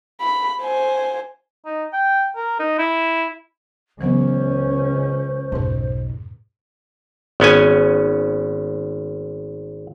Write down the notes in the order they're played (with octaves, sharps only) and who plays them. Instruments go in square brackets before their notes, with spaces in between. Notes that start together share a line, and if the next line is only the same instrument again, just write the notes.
[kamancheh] B5
C5 G#5
[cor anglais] D#4
G5
A#4
D#4
E4
[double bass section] C#2 C#4 [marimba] E3 F#3 B3 [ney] C5
[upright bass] B1 [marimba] F2 G#2 B4
[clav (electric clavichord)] G#1 B3 C#4 G#5